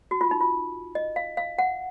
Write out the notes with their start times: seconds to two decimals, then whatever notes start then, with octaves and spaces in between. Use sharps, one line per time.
0.11 F#4
0.21 F4
0.31 D#4
0.41 F4
0.95 D#5
1.16 F5
1.37 F5
1.59 F#5